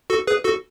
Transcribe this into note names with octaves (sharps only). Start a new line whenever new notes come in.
F#4 A4
G#4 B4
F#4 A4